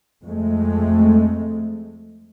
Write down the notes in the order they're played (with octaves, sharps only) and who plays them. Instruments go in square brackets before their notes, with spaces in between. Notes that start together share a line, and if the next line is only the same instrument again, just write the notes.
[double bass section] F2 G#3 A3